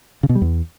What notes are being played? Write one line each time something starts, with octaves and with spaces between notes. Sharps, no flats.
C#3
B2
G3
E2